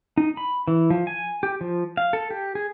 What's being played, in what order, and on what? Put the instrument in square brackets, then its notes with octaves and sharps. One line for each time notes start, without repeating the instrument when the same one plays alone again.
[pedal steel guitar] D#4
B5
E3
F3
G#5
G4
F3
F5
A4
G4
G#4